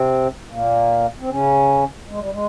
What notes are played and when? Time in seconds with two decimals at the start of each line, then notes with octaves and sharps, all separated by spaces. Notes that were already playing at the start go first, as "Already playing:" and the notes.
Already playing: C3 C4
0.51 A#2 A#3
1.20 C4
1.29 C#3 C#4
2.08 G#3
2.19 G3
2.31 G#3